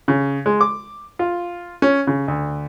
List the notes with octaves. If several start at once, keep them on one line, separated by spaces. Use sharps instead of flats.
C#3
G#3
D6
F4
C#4
C#3
D2